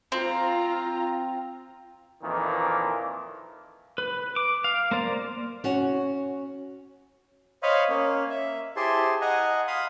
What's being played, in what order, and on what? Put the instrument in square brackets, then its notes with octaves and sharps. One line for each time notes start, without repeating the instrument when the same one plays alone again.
[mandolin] C4 [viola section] F4 A#5
[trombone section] F2 A#2 D#3 E3 A#3
[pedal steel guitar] B4
D6
F5
A#3 C5 D5
[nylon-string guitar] C#4 F#4
[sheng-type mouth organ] C5 C#5 D#5 F5 B5
A#3 C#4
E5
E4 G4 G#4 C5 A5 C6
D#5 F#5 G#5 A#5
F5 B5 C6 D#6